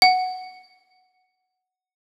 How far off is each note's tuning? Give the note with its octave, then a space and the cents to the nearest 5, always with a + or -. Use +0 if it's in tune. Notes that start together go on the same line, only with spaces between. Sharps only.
F#5 +0